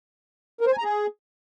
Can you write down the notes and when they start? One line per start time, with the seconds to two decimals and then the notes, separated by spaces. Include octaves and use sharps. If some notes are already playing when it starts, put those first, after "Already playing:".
0.61 A#4
0.66 C5
0.72 G#5
0.78 A#5
0.84 G#4